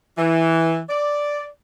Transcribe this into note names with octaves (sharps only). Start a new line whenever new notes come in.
E3
D5